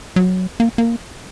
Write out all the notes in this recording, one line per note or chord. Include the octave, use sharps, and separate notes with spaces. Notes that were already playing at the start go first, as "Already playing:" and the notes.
F#3
A#3
A#3